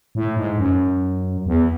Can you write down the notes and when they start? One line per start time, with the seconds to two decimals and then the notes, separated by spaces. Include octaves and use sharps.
0.15 A2
0.37 G#2
0.58 F#2
1.46 E2